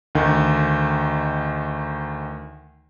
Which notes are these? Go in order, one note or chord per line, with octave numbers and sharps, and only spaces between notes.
D2 D#3